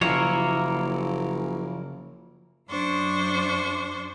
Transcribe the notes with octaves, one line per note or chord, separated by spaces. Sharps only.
F#1 C#3 F3 A#3 E4 C#5
F#2 D4 C5 C#6